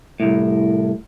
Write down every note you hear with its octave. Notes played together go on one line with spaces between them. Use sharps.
C2 A2